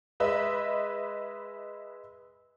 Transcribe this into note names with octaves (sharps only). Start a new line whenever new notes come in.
G#3 B4 D#5 E5